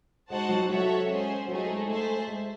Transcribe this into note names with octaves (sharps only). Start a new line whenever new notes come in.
G#3 D#4 F#4 C5 F#5 A5
F#3
F#3 F#4 A4 C#5 E5
G#3 C#4 G#4 C5
F#3 A3 D#4 G#4
G#3
A3 G#4 C5 E5 A5
G#3